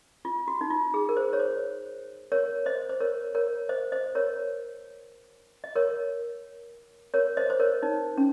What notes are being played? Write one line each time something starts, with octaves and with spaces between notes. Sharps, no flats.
F4
F#4
D#4
F4
G#4
A#4
C5
C#5
C5
A#4 C#5
C5 D#5
C5
A#4 C#5
A#4 C#5
C5 D#5
C5 D#5
A#4 C#5
D#5
A#4 C#5
A#4 C#5
C5 D#5
C5
A#4 C#5
D#4
C#4